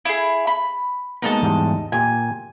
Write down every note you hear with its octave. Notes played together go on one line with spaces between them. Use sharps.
E4 G#4
B5
G#3 A#3 B3 D#4 D#5 A5
E2 G#2 G3
A#2 G4 G#5